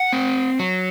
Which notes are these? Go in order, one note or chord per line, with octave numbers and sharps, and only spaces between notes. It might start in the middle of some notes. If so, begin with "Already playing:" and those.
Already playing: F#5
C4
F#3